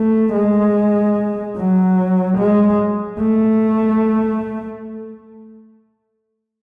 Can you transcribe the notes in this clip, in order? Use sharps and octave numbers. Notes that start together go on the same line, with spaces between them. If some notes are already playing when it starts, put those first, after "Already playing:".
Already playing: A3
G#3
F#3
G#3
A3